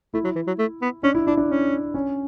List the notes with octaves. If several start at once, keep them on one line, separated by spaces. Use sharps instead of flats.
A3 E4
F#3
E3
F#3
A3
B3
C#4 D4
E4
D4 E4
D4
C#4
C#4